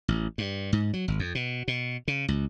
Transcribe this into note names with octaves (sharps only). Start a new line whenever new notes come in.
A1
G2
G#2
F#3
G#1
F2
B2
B2
C#3
C#2